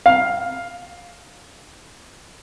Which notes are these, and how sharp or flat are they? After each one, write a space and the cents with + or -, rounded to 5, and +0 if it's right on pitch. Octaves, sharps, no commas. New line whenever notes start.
F5 +10